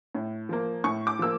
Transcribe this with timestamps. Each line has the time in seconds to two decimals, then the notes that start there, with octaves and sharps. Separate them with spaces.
0.15 A2
0.49 F3 A#3
0.84 A2 C#6
1.07 D6
1.19 F3 A#3 E6